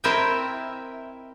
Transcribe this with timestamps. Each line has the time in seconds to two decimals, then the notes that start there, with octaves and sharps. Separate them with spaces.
0.04 C4 E4 A#4 D#5 E5 G5